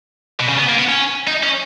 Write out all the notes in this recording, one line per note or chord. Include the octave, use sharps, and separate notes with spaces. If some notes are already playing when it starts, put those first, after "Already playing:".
B2
C#3
B3
A#3
B3
C#4
D#4
C#4